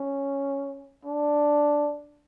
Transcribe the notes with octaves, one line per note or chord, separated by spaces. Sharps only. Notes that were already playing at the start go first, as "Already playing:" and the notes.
Already playing: C#4
D4